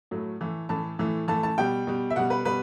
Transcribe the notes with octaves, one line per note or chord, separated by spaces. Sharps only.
A2 F#3 A3
A2 E3 A3
A2 E3 A3 A5
A2 E3 A3
A2 E3 A3 A5
A5
B2 G3 G5
B2 G3
E5
B2 G3 F#5
B4
B2 G3 B4